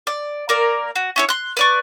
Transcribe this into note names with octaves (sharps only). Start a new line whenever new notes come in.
D5
A#3 A#4 D5
F#4
C#4 E4 C#5
C6 F#6
B4 D5 C#6